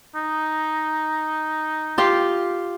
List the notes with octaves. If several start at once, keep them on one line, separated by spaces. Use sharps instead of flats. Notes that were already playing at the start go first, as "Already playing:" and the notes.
D#4
F4 G4 F5